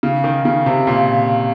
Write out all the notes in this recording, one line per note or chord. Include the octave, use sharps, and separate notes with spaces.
C#3
D#3
C#3
C3
A#2